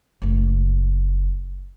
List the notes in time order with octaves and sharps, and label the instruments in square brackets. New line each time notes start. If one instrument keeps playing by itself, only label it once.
[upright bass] F#1 A3